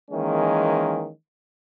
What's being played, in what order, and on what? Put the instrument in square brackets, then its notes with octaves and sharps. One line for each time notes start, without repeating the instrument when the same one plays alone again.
[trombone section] D#3 E3 G#3 A#3 C#4